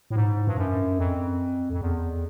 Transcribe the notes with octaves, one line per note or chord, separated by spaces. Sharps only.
A2
G#2
G2
F#2
F2
F2
E2